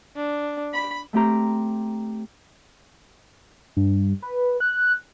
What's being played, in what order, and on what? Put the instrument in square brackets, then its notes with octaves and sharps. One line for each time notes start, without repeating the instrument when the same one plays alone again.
[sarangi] D4
B5
[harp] A3 C4 G4 A#5
[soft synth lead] G2
B4
F#6